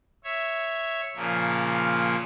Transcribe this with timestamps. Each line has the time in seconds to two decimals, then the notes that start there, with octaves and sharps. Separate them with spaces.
0.24 C#5 E5
1.16 A#2 C#3 F3 A#3